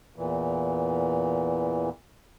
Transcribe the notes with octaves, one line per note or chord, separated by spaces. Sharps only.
E2 A#2 E3